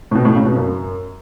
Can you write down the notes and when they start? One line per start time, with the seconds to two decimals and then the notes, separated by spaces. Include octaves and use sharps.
0.11 A2
0.15 B2
0.25 A2
0.36 C#3
0.45 B2
0.56 F#2